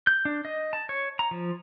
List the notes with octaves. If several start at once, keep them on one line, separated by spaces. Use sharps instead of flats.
G6
D4
D#5
A5
C#5
A#5
F3